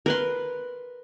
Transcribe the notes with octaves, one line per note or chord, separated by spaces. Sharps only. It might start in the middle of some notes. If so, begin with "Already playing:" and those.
A#4 B4 C6